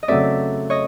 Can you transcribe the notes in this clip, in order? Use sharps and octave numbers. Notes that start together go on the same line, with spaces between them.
D#5
C#3 F#3 A3 C4 D5 E5
C#5 D#5